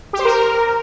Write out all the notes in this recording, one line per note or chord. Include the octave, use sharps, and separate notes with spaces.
G4
C5
A#4